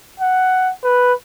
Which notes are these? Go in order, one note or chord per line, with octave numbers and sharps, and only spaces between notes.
F#5
B4